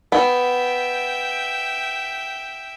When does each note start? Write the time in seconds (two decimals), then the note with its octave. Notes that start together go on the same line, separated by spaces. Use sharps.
0.12 B3 E5 G5